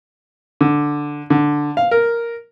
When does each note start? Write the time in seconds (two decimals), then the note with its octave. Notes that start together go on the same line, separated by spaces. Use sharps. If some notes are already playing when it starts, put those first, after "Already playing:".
0.61 D3
1.30 D3
1.77 F5
1.91 A#4